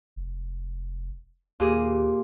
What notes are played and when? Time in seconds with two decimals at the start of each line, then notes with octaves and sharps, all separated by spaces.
0.16 F1
1.60 D#2 A#2 G4 G#4